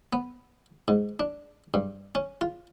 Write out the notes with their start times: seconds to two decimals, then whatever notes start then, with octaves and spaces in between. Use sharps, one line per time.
0.13 B3
0.88 G#2
1.20 D4
1.74 G2
2.15 C#4
2.41 F4